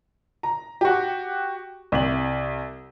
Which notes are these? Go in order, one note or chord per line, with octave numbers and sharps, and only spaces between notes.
A#5
F#4 G4
C2 F#7